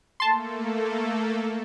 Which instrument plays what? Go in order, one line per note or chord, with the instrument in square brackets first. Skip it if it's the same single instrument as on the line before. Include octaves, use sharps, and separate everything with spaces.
[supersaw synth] A3 A#3 A4 [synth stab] A5 C6